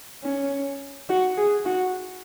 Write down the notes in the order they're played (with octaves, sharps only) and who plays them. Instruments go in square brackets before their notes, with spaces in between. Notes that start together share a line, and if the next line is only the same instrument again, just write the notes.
[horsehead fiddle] C#4
F#4
G#4
F#4